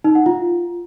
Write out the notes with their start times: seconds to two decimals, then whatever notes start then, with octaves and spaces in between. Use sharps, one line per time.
0.04 D#4
0.15 F#5
0.26 F4